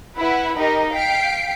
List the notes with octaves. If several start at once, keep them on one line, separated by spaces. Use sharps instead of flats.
E4 B4 E5 F#5 B5
D#4 G4 A#4 D#5
F5 G5 B6 C7 D7